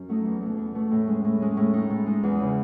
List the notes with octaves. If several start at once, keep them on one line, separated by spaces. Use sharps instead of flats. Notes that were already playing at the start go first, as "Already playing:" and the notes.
Already playing: F#2 C#4
F#3 A3 D#4
E2
B2 A3
E2
B2 A3
A2
G#3 C#4
A2
G#3 C#4
A2
G#3 D#4
A2
G#3 D#4
E2
C#3 E3